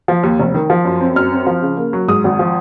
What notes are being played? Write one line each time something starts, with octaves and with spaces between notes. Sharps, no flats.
F3
D#2
F1
D#3
F3
F#2
C4
F#2 F6
C4
F3
C#3
A#3
F#3
G#2 D#6
G#1
F3